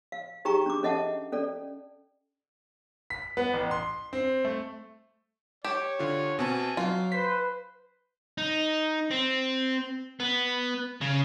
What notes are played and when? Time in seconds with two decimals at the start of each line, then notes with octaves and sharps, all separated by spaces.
0.12 F5
0.45 D#4 G4 G#4 G5 A#5 C#6
0.66 D4 D6
0.83 C#4 A4 D#5 E5 F#5 A5
1.32 C#4 A4 D5
3.10 B6
3.37 B3
3.53 A1
3.71 C6
4.13 C4
4.45 A3
5.64 G4 C#5 E7
5.99 D3 F4
6.39 B2 C4 G#5 A5
6.77 F#3 F4
7.12 B4 C5 B6
8.38 D#4
9.11 C4
10.20 B3
11.01 C#3